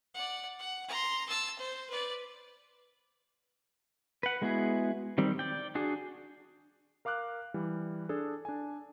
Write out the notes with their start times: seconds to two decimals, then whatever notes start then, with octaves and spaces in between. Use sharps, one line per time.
0.14 D5 F#5
0.59 F#5
0.88 A#5 C6
1.28 A5 E6
1.59 C5
1.90 B4 D5
4.23 B4 F#5
4.42 G#3 B3 E4 F#4 G#4
5.18 D#3 G3 C4
5.39 D5 G5
5.75 D4 F#4 G#4
7.05 A#4 F5 D6 F6 F#6
7.54 E3 G3
8.09 D4 G#4 A4
8.45 D4 G#5